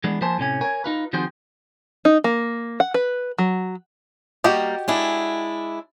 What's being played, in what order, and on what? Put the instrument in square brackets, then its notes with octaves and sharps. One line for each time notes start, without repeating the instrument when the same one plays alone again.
[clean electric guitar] E3 G#3 B3 D4
F3 A#3 C5 G#5 A5 C6
A2 C3 C#4 G#5
A#4 C#5 G#5
D#4 F4 B4
D#3 F3 C4 F#4 G#4 C5
[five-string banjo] D#4
A#3
F#5
B4
F#3
[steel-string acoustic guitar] G3 A#3 [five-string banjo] F#4 G4 D#5
[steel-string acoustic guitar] G#3 D4 E4